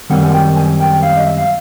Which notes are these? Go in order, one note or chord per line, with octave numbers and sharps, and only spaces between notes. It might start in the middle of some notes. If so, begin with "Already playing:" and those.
F#2 D#3 G3 C4 F#5
G#5
G5
G#5
G5
F5
D#5
E5
F5